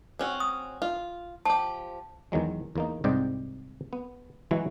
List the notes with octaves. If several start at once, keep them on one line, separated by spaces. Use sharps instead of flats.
C4 C#4 F#4
D#6
F4
F3 G4 A5
E2 D#3 F#3 G#3
E2 A#3 D#4
C2 G#2 C4 D5 D#5 G5
B3
E3 F#3 G#3 E4 F#4